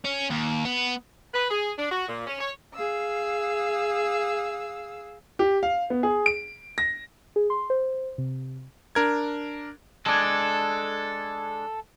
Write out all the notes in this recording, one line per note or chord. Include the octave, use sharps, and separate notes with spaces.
C#4
D#2
B3
B4
G#4
D4
F#4
A#2
C#4
C#5
G#4 F5 E6
G4
F5
B3
G#4
D7
A#6
G#4
C6
C5
C3
D4 A#4 G#6
G#3 D4 A4 E6 G#6